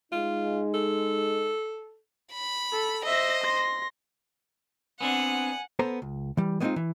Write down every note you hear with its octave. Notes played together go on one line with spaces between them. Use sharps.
G#3 D#4 F4
A4
B5
A4
C5 D#5 E5 A#6
C6 A#6
B3 C4 D4 F#5 G#5
B3 A4 C5 A#5
C#2
E3 G3
G#3 B3 C4 D4 D#4 F4
E3